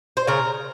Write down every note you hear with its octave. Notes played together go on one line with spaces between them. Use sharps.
C5
C#3 A#4